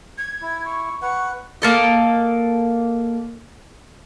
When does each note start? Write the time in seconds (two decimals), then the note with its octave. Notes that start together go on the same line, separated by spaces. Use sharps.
0.18 G#6
0.42 E4
0.65 C#6
1.02 B4 F#5 C#6
1.62 A#3 A4 D#5